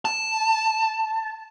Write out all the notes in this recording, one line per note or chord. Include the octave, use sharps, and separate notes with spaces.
A5